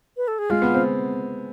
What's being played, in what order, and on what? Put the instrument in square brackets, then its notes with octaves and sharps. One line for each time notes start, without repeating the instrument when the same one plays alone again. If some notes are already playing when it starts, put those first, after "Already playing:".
[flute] B4
A4
G#4
[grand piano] G#3 [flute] F4
[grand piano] B3
C4